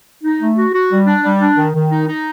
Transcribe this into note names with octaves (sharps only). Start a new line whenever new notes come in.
D#4
A3
F#4
F#4
G3
D4
G3
D4
D#3
D#3
D#4
D#4